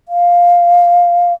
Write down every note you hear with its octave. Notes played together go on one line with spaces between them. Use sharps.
F5